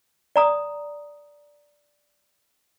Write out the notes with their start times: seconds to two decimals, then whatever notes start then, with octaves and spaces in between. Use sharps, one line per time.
0.36 D5 A#5 D#6